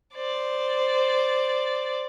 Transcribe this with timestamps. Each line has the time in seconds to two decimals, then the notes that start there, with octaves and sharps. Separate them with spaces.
0.16 C5 D5